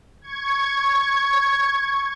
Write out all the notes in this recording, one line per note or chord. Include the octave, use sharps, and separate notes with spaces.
C#6 G#6